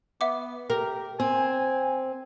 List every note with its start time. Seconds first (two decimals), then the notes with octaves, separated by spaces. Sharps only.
0.21 B3 E5 F#5 D6
0.70 G4 A#4
1.20 C4 G#5